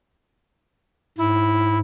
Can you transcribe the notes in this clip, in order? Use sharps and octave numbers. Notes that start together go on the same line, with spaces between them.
G#2 E4